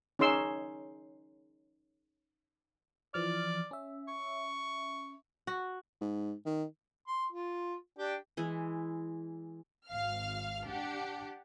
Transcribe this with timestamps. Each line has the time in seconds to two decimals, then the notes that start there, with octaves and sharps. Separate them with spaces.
0.19 C#4 D#4 G#4 C6 E6
3.14 E3 F3 D5 F6
3.71 C#4 E5
4.08 C#6
5.47 F#4
6.01 G#2
6.46 D#3
7.07 C6
7.32 F4
7.98 D4 G4 G5
8.37 E3 G#3 E4
9.88 G#1 F5 F6
10.65 D4 G4 F#5